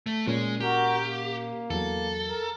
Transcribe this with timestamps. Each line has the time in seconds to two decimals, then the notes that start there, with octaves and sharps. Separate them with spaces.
0.06 A3
0.27 A#2 G#3 C#4
0.60 F#4 G4 A#4
1.00 A#3
1.70 E2 F#3 A4
2.28 A#4